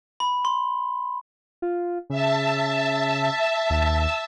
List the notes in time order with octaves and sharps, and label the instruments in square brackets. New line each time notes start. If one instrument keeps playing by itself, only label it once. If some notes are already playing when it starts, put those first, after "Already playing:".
[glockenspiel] B5
C6
[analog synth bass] F4
[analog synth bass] C#3 [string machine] E5 A5
[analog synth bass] D#2